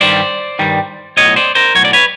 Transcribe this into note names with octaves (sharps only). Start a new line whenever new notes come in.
G2 D#3 G3 C5 D5
G2 D#3 G3
B1 A2 F#3 C#5 D#5
C5 D5
A#4 C5
B1 A2 F#3 C#5
D5
B4 C#5